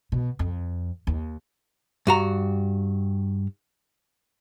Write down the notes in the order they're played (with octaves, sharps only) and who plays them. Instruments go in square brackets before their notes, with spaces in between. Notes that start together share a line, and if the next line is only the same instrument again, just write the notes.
[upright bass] B2
F2
D#2
[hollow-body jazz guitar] G2 F#4 A#5